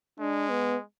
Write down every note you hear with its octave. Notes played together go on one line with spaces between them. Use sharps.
G#3 D4
B3